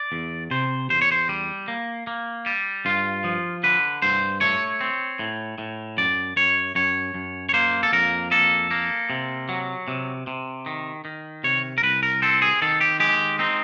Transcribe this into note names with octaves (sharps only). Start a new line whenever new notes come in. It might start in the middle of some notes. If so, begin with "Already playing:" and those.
Already playing: D5
E2
C3 C5
E2 C5
C#5
C5
G3
A#3
A#3
G3
G2 F4
F3
D3 B4
G2 C5
A3 C#5
C4
A2
A2
F#2 D5
F#2 C#5
F#2 C#5
F#2
C#5
A#3 C5
A4
F2 A#4
A#3 A4
A#3
C3
F#3
C3
C3
D#3
D#3
C3 C#5
A#4
C2 B4
A#4
C4 A4
G#4
D#3 A4
G4
G#3 G4
C4 D#4